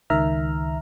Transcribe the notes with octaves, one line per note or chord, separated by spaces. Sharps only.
C#2 D#3 E5 A#5 F6